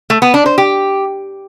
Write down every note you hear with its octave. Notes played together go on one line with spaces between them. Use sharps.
A3
B3
D4
C5
G4